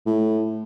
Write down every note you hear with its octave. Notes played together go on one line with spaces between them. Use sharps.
A2